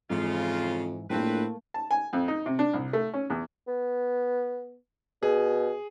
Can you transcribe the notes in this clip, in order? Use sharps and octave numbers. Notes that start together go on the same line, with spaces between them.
F2 G#2 C#3 E3 F4
A#1 A2 A3 A#3 C4 B4
A5
G#5
F2
D#4
C3
D4
C2
A3
C#4
E2
B3
B2 G#4